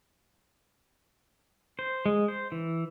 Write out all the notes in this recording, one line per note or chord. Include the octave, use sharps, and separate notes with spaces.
C5
G#3
C5
E3